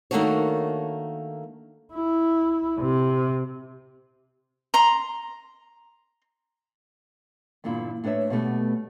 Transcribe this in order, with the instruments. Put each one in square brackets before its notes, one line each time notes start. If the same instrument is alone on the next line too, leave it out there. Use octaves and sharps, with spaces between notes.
[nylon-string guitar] D#3 A3 A#3 D4 F#4 C#5
[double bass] E4
C3
[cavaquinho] A#5 C6
[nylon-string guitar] E2 G2 A#2 D3 E4
A2 D4 B4 C#5 E5
B2 G3 A3 B3